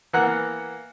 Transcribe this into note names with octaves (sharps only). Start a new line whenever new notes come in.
E3 A#3 B3 F#5 A#5 F#6